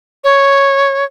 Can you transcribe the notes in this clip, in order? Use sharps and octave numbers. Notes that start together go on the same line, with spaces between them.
C#5